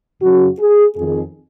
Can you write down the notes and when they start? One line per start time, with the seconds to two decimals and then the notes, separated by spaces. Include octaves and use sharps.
0.22 F#2 C#3 F#4
0.59 G#4
0.96 F2 D#3 G#4